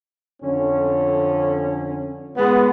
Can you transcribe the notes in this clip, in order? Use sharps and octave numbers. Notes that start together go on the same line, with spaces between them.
F2 D3 C#4
A1 G#3 B3